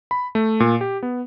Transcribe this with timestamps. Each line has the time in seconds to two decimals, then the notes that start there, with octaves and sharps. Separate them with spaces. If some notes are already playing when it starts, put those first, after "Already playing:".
0.11 B5
0.35 A3
0.60 A#2
0.81 G4
1.03 B3